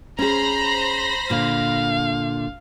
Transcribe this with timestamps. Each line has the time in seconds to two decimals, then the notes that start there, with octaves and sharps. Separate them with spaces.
0.19 C#4 G#4 C5 A#5 B5 A#6
1.30 A#2 D3 F5